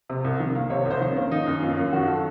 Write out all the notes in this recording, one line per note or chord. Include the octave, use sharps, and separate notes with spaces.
C3
C2
D#3
A#3
C3 C#5
C2
C5
D#3
A#3 C#4
D#3 D#4
F#2
A#3 F4
F#2
D#3 F#4
A4